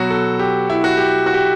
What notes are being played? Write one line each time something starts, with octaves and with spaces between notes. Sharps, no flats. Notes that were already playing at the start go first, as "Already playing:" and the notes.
Already playing: B2 F#3 F#4
A4
G4
E4
F#4
G4
F#4
G4